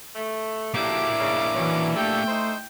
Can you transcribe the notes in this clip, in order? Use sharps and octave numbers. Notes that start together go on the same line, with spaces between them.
A3
D2 F#3 A#3 D4 E4 G4 D6
G#2 C#3
E3 F#3 C#4
G3 A3 G4 A4 G5
D#4 C5